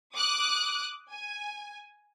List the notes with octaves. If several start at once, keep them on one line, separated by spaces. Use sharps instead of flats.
D6 D#6 F#6
G#5